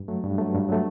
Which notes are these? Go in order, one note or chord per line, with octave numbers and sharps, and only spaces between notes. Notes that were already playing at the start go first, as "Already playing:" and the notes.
Already playing: G2
F#3 A3
G2
F#3 A3
G2
F#3 A3